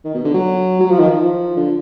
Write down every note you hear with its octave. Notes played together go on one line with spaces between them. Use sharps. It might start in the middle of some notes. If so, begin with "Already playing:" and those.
D#3
B2
D3
F#3
F#3
F3
D#3
F3
D3